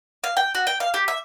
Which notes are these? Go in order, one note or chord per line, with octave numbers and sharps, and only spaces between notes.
F5
G5
F#4
G5
F5
G4
E5